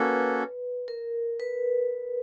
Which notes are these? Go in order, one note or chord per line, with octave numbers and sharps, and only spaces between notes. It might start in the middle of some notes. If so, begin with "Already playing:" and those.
Already playing: A#3 C#4 F#4 A4 B4
A#4
B4